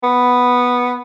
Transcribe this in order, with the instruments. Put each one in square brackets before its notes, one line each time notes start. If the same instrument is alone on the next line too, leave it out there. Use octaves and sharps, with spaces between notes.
[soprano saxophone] B3